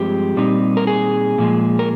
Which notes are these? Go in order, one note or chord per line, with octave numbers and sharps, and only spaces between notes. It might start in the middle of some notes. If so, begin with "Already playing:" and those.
Already playing: G2 F3 G#3 C4 G4
A#2 G3 C4 D#4
A#4
G#4
A#2 F3 G#3
A#4